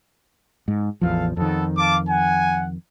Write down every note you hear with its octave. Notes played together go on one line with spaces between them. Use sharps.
G#2
A1 E2 F3 A4 F5
F2 D#3 B3 A4
F5 A5 D6
F#5 G#5